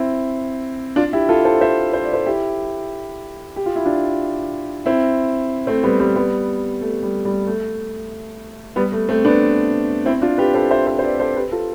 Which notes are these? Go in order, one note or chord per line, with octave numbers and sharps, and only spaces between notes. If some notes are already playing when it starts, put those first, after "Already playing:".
Already playing: C4 E4
D4 F4
E4 G4
F4 A4
A4 C5
C5 E5
C5
D5
A4 C5
E4 G4
G4
F4
E4
D4 F4
C4 E4
A3 C4
G3 B3
G3 B3
G3 B3
A3
G3
G3
A3
G3 B3
A3
A3 C4
B3 D4
C4 E4
D4 F4
G4 B4
A4 C5
C5 E5
C5 E5
C5
B4 D5
A4 C5
G4 B4
F4 A4